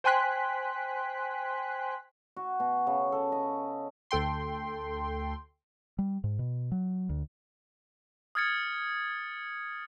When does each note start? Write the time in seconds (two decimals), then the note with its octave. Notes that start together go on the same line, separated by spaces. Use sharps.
0.04 C5 G5 G#5 C6 F#6 B6
2.36 F#4
2.60 B2
2.87 C#3
3.12 A4
3.32 D#5
4.11 D2 A4 G5 C6
5.99 G3
6.24 G#2
6.39 B2
6.72 F#3
7.09 D2
8.35 D#6 F6 G#6 A6 C#7